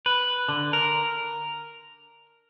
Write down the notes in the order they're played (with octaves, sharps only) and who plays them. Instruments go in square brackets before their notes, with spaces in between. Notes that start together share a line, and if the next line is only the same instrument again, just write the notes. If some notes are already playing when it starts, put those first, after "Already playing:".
[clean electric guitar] B4
D3
A#4